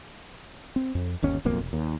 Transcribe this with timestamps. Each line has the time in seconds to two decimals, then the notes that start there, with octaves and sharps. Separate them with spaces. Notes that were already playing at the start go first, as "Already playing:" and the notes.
0.76 C4
0.95 F2
1.22 G1 D#2 C#4
1.45 D1 B1 F2 A#3
1.59 E1
1.73 D#2